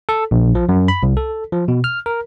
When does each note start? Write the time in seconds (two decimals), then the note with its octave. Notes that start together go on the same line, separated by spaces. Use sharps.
0.09 A4
0.31 A#1
0.55 F3
0.69 F#2
0.88 B5
1.03 C2
1.17 A4
1.53 F3
1.68 B2
1.84 F6
2.06 A#4